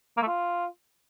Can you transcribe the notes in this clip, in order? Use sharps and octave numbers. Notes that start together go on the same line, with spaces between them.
A#3
A3
F4